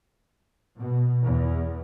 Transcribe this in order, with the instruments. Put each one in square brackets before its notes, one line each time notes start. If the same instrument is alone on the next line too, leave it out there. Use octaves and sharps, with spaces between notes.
[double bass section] B2
E2